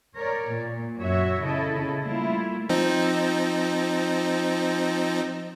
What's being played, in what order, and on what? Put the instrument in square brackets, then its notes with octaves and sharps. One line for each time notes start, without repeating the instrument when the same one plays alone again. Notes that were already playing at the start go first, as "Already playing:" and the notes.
[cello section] A#4 C#5 D5
A#2
F#2 F#4 C#5 E5
C#3 E4 A4 D#5
G3 A3 A#3 E4 F4
[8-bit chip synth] F3 C4 D#4